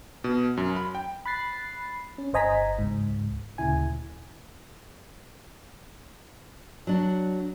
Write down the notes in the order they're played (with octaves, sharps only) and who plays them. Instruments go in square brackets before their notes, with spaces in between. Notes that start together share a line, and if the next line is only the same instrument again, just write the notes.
[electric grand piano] B2
F#2
B5
G5
[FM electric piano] B5 F#6 A6 C7
C#4
G1 C5 D#5 G#5 A#5 B6
C#2 G#2
D2 A#2 C#3 E4 G#5
[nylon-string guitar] F#3 D4